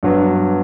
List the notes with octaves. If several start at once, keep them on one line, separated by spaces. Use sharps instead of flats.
G2 F#3 B3